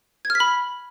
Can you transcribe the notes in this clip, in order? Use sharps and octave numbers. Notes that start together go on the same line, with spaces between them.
G#6
F6
B6
B5